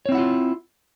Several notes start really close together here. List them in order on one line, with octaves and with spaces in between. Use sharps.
C#5 C4 E4 F#5 F4